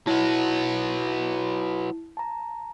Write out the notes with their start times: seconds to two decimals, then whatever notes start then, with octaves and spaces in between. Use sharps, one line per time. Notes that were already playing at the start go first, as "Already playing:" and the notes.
0.07 F#3 B3 E4 A5
2.17 A5 A#5